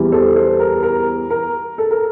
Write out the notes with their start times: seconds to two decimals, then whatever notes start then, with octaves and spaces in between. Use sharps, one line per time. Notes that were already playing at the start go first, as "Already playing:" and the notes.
Already playing: E2 E3 G3
0.12 A4 C5
0.35 A4 C5
0.60 A#4
0.83 A#4
1.30 A#4
1.78 A4
1.91 A#4